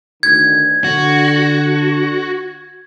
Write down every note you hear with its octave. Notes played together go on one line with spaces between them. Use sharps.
D2 D3 D#3 G#6
D3 F#4